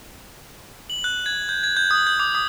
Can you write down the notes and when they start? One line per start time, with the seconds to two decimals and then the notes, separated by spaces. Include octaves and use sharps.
0.90 F#7
1.04 F#6
1.26 G#6
1.49 G6
1.63 G#6
1.77 G6
1.91 D#6
2.07 G6
2.19 D6
2.35 D#6